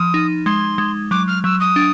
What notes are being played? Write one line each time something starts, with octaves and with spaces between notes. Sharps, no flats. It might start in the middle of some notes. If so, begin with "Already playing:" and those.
Already playing: F3 D#6
D#4
G#3 C6
G#3
F#3 D6
F6
F#3 E6
D#6
D4